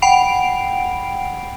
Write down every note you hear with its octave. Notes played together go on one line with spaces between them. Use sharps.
F#5 G5 B5 C7 D7 F7